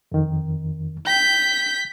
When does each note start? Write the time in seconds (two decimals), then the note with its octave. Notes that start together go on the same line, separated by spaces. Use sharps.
0.12 F2 D#3
1.07 G5 G6 B6